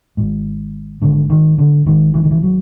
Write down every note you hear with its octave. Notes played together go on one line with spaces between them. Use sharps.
G#1 G#2
G#1 G#2 D3
D#3
D3
G#1 G#2 D#3
E3
D#3
E3
F#3